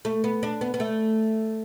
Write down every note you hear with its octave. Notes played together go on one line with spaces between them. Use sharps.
A3
B3
D4
B3
B3
A3